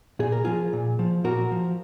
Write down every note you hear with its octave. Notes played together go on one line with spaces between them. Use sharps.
A#2 G#4
A#4
F3 F4 G#4
A#2
F3
A#2 F#4 A#4
F3